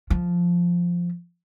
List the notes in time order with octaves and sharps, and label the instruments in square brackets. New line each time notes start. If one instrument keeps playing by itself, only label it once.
[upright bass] F3